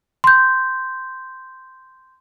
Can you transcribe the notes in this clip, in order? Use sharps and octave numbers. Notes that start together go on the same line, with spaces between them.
C6 G6